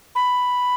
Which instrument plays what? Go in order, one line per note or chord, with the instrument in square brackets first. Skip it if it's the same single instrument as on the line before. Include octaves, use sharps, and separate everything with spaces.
[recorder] B5